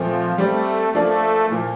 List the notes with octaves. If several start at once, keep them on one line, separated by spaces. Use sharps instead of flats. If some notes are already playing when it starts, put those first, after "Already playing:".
Already playing: A#2 F3 A3 C4
G3 A3 C4 G4 D5
F3 A3 A#3 D4 A4 D5
A#2 F3 A#3